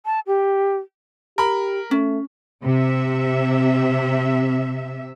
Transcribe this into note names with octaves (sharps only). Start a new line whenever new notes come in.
A5
G4
G4 A#4 B5
A3 C#4
C3 E5